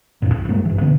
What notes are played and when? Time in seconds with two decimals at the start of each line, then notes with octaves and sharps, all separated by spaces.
0.22 E1 F#2 A#2
0.34 B1
0.48 G2 G3 G#3 A#3
0.65 F#1 E3
0.81 B2 D3 A#3 B3